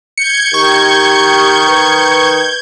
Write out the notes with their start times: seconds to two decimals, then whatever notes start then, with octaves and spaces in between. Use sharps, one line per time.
0.18 G6 G#6 C#7
0.54 D#3 G4 C#6
1.68 B4